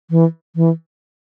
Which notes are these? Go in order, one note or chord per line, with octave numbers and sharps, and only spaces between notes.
E3
E3